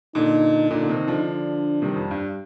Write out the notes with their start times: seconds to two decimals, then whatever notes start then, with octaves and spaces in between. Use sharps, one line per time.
0.15 A#2 D3 D#4
0.71 A#2 D3 D#4
0.84 D3
0.89 C3 D#3
1.07 D3 F3
1.27 D4
1.82 C3 D#3 G3
1.96 F2
2.11 G2